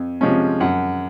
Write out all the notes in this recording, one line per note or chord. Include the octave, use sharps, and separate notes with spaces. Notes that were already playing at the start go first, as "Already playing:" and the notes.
Already playing: F2
C3 F3 G#3 C#4
F#2 F#5